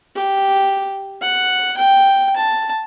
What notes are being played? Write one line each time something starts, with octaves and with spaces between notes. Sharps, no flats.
G4
F#5
G5
A5